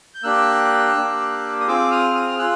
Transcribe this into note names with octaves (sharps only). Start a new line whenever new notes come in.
G6
A#3 D4 G4 E6 F#6
A#3 D4 G4
D#6
C4 F4 G#4 D6 E6
D#6 F6
D#6 F6
F6
F4 G#4 E6 F#6